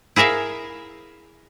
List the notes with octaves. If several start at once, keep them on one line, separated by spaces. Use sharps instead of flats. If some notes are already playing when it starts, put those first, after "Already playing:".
E4 G#4 A#4 E5 F5